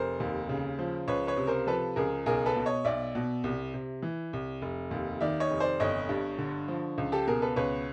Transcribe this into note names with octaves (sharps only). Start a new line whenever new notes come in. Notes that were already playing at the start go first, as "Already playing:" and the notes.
Already playing: F1 A#4 C5
D#2
C#3
F3
C#2 B4 C#5
B4 C#5
C3
A#4 C5
F3 A4 B4
C#2 G#4 A#4
B1 G#4 A#4
A4 B4
B2
C#5 D#5
B1 D5 E5
B2
C2
C3
E3
C2
F1
D#2
D#3 D5 E5
C#5 D#5
F1
C5 D5
G1 C#5 D#5
G2
D3
F3
C#2
G4 A4
B2 G#4 A#4
A4 B4
C#2 B4 C#5